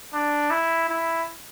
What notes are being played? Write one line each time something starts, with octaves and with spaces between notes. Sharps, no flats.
D4
E4
E4